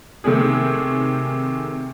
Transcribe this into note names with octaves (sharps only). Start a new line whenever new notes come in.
C3 D#3 A3 C4 G#4